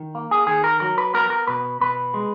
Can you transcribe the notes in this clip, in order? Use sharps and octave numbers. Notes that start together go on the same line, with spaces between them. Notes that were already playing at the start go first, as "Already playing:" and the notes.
Already playing: D#3
A#3
G#4
D#3 G#4
A#4
F#3 A#4
B4
B3 A#4
A#4
B2 B4
B2 B4
G#3